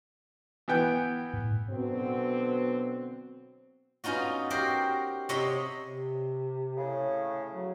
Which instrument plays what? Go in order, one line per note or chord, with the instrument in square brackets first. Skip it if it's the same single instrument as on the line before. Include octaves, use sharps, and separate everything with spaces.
[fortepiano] E3 B3 G5
[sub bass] A2
[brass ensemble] B2 D3 F#3 B3 C4
[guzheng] B3 C#4 D#4 F4 F#4
F#4 G4 A#4 C5 G5
C3 C#5 D#5 E5 B5 C6
[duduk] C3
[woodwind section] A2 C#3
[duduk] F#3